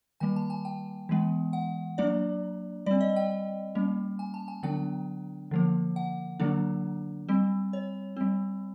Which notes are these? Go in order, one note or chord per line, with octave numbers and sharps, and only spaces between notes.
D#3 G3 A#3 G#5
A5
G#5
G5
E3 G#3 B3
F#5
F#3 A#3 D4 D5
G3 C4 D5
D#5
G5
G3 A#3 C#4
G#5
A5
G#5
D3 F#3 B3 D4 G5
D3 F3 A#3
F#5
D3 F#3 A#3 D4
G3 C4
C#5
G3 C4